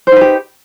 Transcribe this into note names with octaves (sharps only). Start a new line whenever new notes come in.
D#4 G4 B4 C5